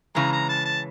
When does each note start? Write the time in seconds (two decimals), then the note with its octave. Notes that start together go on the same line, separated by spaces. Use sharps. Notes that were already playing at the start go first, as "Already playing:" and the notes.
0.15 C#3 E3 G#3 A#5
0.33 A#5
0.49 A5
0.65 A5